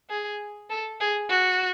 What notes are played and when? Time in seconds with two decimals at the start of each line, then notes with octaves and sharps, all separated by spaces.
0.10 G#4
0.70 A4
1.00 G#4
1.30 F#4